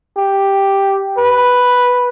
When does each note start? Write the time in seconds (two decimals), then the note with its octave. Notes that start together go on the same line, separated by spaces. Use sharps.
0.17 G4
1.18 B4